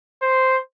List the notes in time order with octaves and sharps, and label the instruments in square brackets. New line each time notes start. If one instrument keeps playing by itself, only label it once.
[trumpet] C5